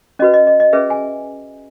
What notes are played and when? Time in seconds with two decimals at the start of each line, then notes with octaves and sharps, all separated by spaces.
0.19 C#4 F#4 B4 D#5
0.34 D#5
0.47 D#5
0.60 D#5
0.73 C#4 G#4 B4 E5
0.90 G#5